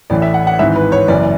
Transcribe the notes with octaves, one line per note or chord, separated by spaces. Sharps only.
A1 A2 E3 D5
E5
F#5
F#5
G#1 G#2 E3 E5
B4
C#5
F#1 F#2 E3 D5